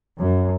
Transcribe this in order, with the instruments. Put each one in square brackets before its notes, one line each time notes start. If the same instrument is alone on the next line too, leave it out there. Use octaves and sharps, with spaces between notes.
[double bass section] F#2